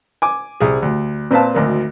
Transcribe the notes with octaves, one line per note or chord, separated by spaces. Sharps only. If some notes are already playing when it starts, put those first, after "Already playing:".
G#5 D6
C2 G#4
D2
A#2 C4 B4 F5 A5
G#1 D2 A#4